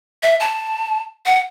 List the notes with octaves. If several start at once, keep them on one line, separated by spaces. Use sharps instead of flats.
E5
A5
F#5